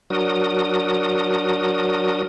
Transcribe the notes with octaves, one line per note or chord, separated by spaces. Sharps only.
F#3 D4 F#4 A#4 D#6